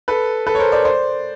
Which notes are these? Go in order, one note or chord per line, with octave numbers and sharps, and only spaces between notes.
A4 B4
A4 B4
C#5
A#4 C5
C5 D5
C5 D5